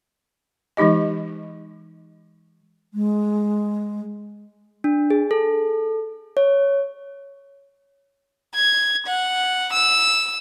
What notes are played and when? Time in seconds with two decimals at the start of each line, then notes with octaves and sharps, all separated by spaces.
0.77 E3 G#3 D#4 G4 D#5
2.94 G#3
4.84 D4
5.10 G#4
5.31 A4
6.37 C#5
8.55 G#6
9.07 F#5
9.73 E6